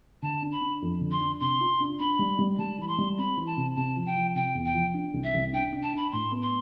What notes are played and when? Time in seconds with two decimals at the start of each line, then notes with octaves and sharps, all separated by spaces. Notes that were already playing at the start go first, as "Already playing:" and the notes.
0.22 D3 A5
0.42 D4
0.52 B5
0.61 D4
0.82 F2
1.01 D3
1.11 C6
1.20 D4
1.40 C3 C6
1.61 F4
1.80 D4
1.99 D4 B5
2.19 G3
2.39 G3
2.58 G3 A5
2.78 E3 B5
2.88 C6
2.98 G3
3.18 C4 B5
3.37 E3
3.46 A5
3.57 C3
3.76 C3 A5
3.96 F3
4.06 G5
4.16 F3
4.35 C3 G5
4.55 E2
4.65 G5
4.74 F3
4.94 D4
5.14 C2
5.24 E5
5.34 C2
5.53 D4 G5
5.72 D4
5.83 A5
5.93 D4 B5
6.12 A2 C6
6.31 B3
6.42 C6